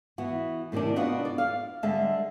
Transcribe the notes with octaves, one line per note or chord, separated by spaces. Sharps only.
E3 B3 F#4
A2 C3 D#3 C#4 D4
B3 D4 F4 F#4 B4 D#5
D5
F5
D3 G3 G#3 E5 A5